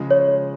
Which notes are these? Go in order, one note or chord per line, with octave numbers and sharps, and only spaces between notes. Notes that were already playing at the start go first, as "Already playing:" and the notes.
Already playing: C#3 F3 G#3
C#5